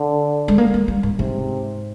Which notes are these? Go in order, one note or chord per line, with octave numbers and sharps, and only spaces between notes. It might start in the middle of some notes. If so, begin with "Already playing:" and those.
Already playing: D3
G#3
A#3
G#3
G3
G#2
G#2 C3